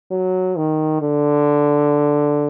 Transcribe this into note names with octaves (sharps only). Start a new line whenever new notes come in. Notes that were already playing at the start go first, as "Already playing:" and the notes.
F#3
D#3
D3